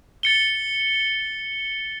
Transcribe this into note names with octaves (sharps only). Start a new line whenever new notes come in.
A6 C#7 G7